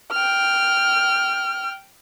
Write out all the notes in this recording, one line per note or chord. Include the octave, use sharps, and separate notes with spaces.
G5 F6